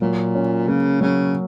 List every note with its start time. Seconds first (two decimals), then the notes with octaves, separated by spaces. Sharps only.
0.01 A#2 F#3
0.35 C#4
0.68 C#3 A#3
1.01 C#3 F#3